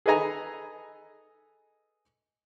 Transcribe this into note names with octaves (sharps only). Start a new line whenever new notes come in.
G#4 A4 B4 D#5 G#5 A#5